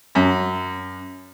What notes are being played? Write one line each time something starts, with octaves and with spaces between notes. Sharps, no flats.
F#2